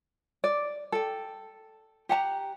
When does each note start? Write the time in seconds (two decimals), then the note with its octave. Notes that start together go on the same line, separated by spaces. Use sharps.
0.44 D5
0.92 A4 G5
2.09 G4 F#5 A5 A#5